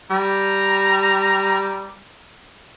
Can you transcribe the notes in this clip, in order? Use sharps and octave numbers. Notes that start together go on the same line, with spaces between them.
G3 A#5